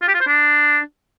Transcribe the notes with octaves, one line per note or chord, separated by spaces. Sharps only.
F4
G4
F4
C5
D4